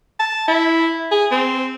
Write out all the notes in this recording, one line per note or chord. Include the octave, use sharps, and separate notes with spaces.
A5
E4
G#4
C4